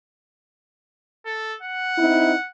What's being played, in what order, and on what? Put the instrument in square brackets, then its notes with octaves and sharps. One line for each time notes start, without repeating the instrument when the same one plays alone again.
[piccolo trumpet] A4
F#5
[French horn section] C4 D#4 E4